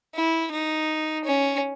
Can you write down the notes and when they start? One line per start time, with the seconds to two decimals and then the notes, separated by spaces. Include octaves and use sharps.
0.15 E4
0.51 D#4
1.25 C#4